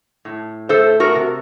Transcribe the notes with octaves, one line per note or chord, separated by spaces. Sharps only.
A2
A3 A4 C5
F#4 A#4
C3